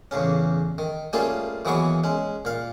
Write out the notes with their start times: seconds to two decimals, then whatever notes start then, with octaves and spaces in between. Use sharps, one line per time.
0.11 A1 E2 C#3 C#4
0.78 D#3
1.13 G3 A3 A#3 C#4 F4 G#4
1.65 D#2 E3 F#3 B3 G#4 C#6
2.04 G#3 C#4
2.45 A#2 F5